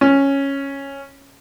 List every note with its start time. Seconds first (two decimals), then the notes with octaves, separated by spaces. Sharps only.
0.01 C#4